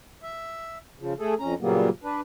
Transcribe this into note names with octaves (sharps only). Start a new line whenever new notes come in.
E5
C#3 F3
A3 G#4 A4
F2 C#4 A#5
A#2 C#3 F#3 G3 A#3 B3
D4 B4